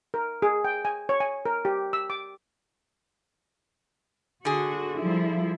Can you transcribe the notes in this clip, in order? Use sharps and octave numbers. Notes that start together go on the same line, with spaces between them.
A#4
G#4
G5
G#5
C#5
G#5
A#4
G4
E6
D6
D3 F#4 G#4
F3 G3 E4